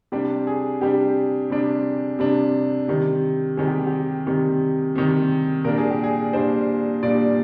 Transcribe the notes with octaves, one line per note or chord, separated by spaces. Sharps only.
C3 G3 D4 G4
G#4
C3 G3 D4 G4
C3 G3 D4
C3 G3 D4
C3 D#3 G3
C3 D#3 G3 G#4
G4
G4
C3 D#3 G3
C3 D#3 G3
A#2 G3 D4 A#4
G#4
G4
G#4
A#2 G3 D4 C5
A#2 G3 D4 D5